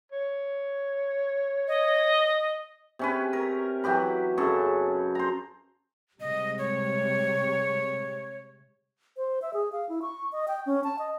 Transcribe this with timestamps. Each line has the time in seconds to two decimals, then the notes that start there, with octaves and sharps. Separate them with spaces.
0.12 C#5
1.68 D#5
2.99 C3 C#4 B4
3.33 A#4
3.84 E3 F#3 G4 B4
4.38 F#2 C#3 A4 C#6
5.15 C5 A#5
6.20 C3 G3 G#3 D#5
6.58 C#5
9.17 C5
9.42 E5
9.54 G#4
9.72 F5
9.89 E4
10.02 C#6
10.32 D#5
10.48 G5
10.66 C#4
10.84 A5
10.99 D#5